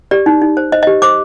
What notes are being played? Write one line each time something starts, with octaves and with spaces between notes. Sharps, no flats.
G4 D5
D#4
D#4
C5
C5 D#5
G4 D#5
C5 D6